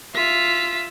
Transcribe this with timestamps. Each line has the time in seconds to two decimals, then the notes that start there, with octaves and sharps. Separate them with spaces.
0.15 F4 E5 B6